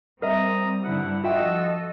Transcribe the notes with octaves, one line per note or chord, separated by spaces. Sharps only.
G3 C4 A#4 D#5 E5 A#5 D#6
G2 D3 E4 F#5
F3 F4 F#4 A4 D#5 E5 G5 E6